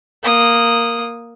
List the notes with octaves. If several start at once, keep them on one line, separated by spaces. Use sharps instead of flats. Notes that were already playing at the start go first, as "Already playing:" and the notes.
A#3 D#6